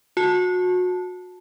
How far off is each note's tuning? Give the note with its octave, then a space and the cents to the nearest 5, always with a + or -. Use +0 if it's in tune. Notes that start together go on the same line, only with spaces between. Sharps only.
F#4 -30 A5 +0